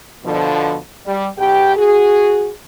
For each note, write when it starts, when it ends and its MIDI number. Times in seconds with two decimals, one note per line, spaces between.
0.25 0.77 47
0.25 0.77 50
0.25 0.77 53
1.06 1.28 55
1.38 1.74 35
1.38 1.74 47
1.38 1.74 67
1.38 1.74 79
1.76 2.50 66
1.76 2.50 68